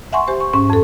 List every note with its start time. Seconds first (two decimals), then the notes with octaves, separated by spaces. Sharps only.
0.13 E5 F#5 G#5 C6 C#6
0.27 G4 C5 G#5
0.40 C#6
0.53 G#2 C#4 C#6
0.70 F2 A4